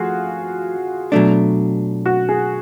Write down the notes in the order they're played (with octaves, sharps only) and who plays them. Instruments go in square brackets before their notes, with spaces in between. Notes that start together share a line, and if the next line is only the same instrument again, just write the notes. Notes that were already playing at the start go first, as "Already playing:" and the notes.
Already playing: [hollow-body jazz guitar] F3 A3 [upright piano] F4 F#4 G#4
[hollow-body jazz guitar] B2 F#3 A3 D4
[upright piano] F#4
G#4